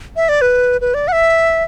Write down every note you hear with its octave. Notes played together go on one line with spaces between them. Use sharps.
E5
D5
B4
B4
D5
F#5
E5